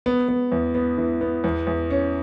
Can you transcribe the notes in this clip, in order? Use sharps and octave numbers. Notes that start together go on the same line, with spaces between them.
B3
B3
E2
B3
E3
B3
E2
E2
C#4